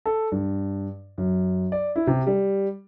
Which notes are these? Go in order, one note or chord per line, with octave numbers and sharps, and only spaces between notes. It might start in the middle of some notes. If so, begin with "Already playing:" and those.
A4
G2
F#2
D5
E4
C3
G3